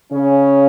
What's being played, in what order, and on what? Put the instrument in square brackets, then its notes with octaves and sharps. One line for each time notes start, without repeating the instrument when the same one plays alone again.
[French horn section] C#3 C#4